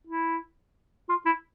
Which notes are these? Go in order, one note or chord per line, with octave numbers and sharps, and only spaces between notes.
E4
F4
E4